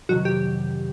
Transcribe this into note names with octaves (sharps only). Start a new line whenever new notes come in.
F2 C3 D#3 F#3 F#4
G4